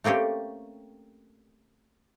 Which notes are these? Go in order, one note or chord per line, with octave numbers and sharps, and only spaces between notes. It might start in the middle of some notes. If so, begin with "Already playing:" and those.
A3 A#3 C4 C#4 G4